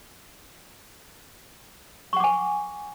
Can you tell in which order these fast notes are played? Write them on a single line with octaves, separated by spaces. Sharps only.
C#6 F#5 D6 G#5